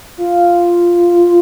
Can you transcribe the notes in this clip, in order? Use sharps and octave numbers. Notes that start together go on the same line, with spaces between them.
F4